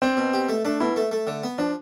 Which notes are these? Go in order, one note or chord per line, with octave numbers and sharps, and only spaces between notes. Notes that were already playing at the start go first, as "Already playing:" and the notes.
C4 D4
B2
G4
A3
A3 D4
B2 E4
A3
A3
D3
B3
F3 D4